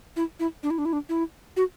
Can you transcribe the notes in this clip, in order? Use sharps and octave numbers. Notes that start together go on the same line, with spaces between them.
E4
E4
D4
E4
D4
E4
D4
E4
F#4